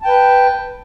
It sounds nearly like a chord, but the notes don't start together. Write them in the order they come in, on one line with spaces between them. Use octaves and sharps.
A5 G5 B4